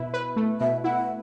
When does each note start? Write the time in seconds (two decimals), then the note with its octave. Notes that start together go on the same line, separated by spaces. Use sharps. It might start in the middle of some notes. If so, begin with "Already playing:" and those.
Already playing: B2 E4 B4
0.14 B4
0.36 A3
0.60 B2 E5
0.84 E4 F#5